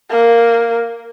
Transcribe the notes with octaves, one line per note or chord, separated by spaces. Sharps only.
A#3